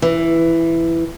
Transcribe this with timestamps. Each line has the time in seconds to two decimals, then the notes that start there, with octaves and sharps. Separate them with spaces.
0.02 E3